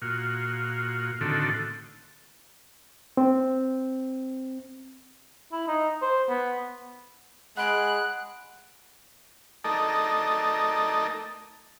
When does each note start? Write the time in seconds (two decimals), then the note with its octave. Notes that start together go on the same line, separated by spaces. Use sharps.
0.02 A#2 F4 F#4
1.21 A2 D3 D#3 C4 F#4 A4
3.17 C4
5.52 E4
5.68 D#4
6.02 C5
6.29 B3
7.57 G#3 F#5 B5 F#6 D7
9.64 A3 D#4 A4 A#4 D5 D#5